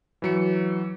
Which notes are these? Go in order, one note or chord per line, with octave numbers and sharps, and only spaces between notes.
E3 F#3 C#7